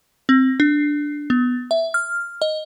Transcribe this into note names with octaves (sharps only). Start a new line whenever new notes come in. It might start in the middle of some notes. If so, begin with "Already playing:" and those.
C4
D4
B3
E5
F6
D#5